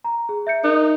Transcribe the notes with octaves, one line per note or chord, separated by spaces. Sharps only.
A#5
G#4
E5 G6 C#7
D#4 A#4